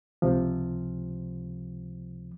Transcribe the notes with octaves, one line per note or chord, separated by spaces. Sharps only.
C#2 C3 F3